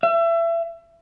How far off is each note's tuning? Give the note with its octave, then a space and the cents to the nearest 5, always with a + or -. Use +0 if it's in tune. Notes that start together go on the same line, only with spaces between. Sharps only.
E5 +30